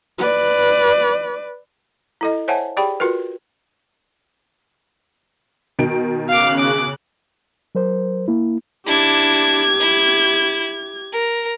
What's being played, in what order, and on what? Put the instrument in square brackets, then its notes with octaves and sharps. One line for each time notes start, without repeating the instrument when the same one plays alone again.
[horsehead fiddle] B4 D5
[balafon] E4 A4 D#5
C5 C#5 E5 F#5 G#5 A5
G4 G#4 D5 G5 B5
F4 F#4 A#4 B4
[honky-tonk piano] B2 D#3 D7
[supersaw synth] C#3 F#6 [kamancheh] F5 D6
[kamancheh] D6
[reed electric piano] F#3 A#4 C5
A#3 E4
[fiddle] D4 E4 [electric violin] G4 G#6
[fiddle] E4
A#4